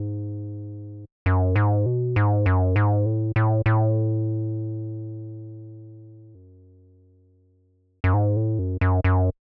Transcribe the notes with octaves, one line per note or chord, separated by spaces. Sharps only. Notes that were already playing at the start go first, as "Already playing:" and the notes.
Already playing: G#2
F#2
G#2
B2
G#2
F#2
G#2
A2
A2
A2
F#2
F#2
G#2
A2
F#2
F#2
F#2